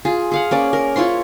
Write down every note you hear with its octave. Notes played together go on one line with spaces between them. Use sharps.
F4 G#4
G#4 F5 F#5
A#3 C#4 D5
A#4
E4 F4 C#5 C6